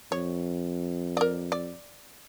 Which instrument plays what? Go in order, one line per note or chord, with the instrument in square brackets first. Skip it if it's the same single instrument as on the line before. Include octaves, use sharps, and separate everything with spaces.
[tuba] F2 [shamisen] C#5
[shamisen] A#4 D5
D5